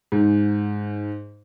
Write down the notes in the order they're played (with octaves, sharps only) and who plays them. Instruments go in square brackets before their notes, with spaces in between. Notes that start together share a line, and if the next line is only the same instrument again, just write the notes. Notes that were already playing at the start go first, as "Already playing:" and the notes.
[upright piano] G#2